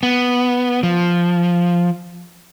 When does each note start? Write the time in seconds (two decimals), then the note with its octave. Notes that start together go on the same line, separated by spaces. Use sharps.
0.03 B3
0.83 F3